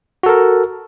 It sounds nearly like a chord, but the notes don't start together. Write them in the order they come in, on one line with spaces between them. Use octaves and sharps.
F#4 A4 A#4